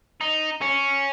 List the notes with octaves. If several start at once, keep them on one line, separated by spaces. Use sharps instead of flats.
D#4
C#4